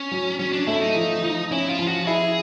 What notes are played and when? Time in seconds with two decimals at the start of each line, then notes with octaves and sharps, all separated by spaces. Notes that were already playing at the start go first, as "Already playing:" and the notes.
Already playing: C#4
0.12 F#3
0.39 F#3 C#4
0.53 D4
0.67 A3 E4
0.81 D#4
0.95 F3
1.23 F3
1.51 C#4 E4
1.70 F4
1.79 F3
1.87 F#4
2.07 E4 G#4